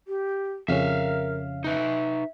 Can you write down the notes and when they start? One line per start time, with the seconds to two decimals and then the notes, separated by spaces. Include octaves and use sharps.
0.08 G4
0.68 F2 C#3 C#4 A#4 E5 F5
1.64 D#4 B4 E5